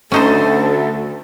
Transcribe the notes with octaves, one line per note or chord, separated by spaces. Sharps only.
D2 C#4 D#4 A4 C5